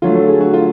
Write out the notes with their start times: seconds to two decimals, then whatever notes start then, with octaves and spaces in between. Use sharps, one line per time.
0.02 D3 F#3 A3 F4
0.14 A4
0.28 G#4
0.41 F#4
0.53 F4